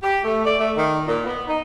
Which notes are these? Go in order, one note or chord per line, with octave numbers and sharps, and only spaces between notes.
G4
A3
D5
A3
D#3
A#2
B3
D#4